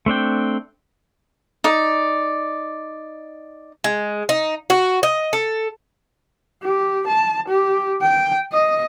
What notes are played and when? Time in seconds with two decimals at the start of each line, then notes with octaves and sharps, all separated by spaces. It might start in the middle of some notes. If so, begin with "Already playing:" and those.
0.06 A3 C4 D4 G5
1.64 D#4 D5
3.84 G#3
4.29 D#4
4.70 F#4
5.03 D#5
5.33 A4
6.63 G4
7.07 A5
7.48 G4
8.02 G5
8.52 D#5